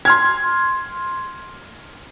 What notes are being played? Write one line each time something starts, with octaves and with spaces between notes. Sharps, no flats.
C6 F6 G#6